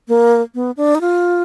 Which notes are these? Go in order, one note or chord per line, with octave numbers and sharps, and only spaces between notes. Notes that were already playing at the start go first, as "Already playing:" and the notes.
A#3
B3
D4
D#4
F4